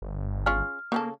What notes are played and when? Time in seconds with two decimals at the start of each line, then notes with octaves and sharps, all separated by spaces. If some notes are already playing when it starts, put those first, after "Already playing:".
0.02 G1
0.46 C#4 F4 G#4 F6
0.92 C#3 A#3 C4 A4